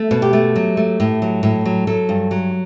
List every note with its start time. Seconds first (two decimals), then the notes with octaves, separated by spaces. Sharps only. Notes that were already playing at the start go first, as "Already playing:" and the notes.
Already playing: A3
0.11 B2
0.22 G4
0.33 A3
0.56 F#3
0.77 A3
1.00 A2
1.22 F#3
1.43 A2
1.65 F#3
1.87 F#3 A4
2.09 G2
2.31 F#3